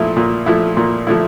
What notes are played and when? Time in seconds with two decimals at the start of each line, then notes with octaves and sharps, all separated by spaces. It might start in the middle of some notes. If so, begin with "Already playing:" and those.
Already playing: A#2 F3 A3 E4
0.17 A#2
0.46 F3 A3 E4
0.77 A#2
1.07 F3 A3 E4